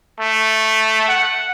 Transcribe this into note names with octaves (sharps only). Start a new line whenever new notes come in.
A3
F#5